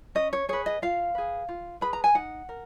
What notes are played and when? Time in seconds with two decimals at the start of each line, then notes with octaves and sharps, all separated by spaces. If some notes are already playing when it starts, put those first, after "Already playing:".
0.15 C#4 D#5
0.33 C#5
0.49 G#4 B4 C#5
0.66 D#5
0.82 F4 F5
1.15 G#4 B4
1.49 F4
1.81 G#4 B4 B5
1.93 A#5
2.04 G#5
2.15 D#4 F#5
2.49 A#4